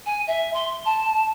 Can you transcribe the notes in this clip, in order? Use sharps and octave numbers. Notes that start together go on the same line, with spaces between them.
G#5
E5
C6
A5